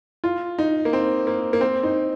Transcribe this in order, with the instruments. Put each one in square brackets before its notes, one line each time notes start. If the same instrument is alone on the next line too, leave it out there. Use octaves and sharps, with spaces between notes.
[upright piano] F4
D#4
A#3
C4
A#3
A#3
C4
D#4